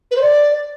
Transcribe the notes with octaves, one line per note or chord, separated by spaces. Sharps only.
B4
C5
D5